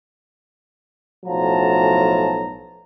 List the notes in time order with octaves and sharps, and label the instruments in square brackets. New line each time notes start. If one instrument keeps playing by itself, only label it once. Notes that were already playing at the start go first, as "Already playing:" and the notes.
[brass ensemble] B1 A2 F3 F#3 A5 A#5